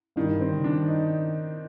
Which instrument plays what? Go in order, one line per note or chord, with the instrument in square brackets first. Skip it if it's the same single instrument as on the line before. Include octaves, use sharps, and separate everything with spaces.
[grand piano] G2 [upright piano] D#3
[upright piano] C4
[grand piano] D#3
[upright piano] D4
D#4